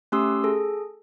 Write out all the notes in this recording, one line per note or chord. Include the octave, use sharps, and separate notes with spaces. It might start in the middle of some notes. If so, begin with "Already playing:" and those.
A3 C#4 G4 C6 D#6 E6
G#4 A4